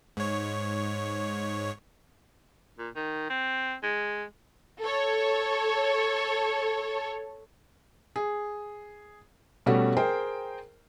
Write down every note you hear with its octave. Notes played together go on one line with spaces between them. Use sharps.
G#2 C#5
A#2
D#3
C4
G#3
A4 C#5
G#4
B2 G3 A3 C#4 F#4
G#4 A#4 C5 G5